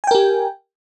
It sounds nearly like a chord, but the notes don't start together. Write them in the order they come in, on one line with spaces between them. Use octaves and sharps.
G#5 G5 A#4 G4